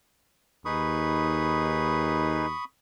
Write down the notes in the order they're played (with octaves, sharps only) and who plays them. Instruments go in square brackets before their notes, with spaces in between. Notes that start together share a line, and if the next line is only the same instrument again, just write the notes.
[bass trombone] D#2 [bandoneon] D#4 G#4 B4 [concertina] B5 C#6 D#6